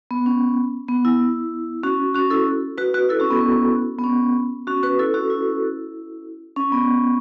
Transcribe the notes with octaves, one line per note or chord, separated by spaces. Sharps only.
B3
C#4
B3
E4
C#4 F#4
C#4 F#4
E4 A4
F#4 B4
F#4 B4
E4 A4
C#4 F#4
B3
B3
B3
C#4
C#4 F#4
F#4 B4
E4 A4
C#4 F#4
E4
C#4
B3